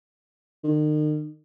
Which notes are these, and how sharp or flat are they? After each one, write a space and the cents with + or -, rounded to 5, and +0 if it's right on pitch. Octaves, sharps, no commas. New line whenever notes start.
D#3 -40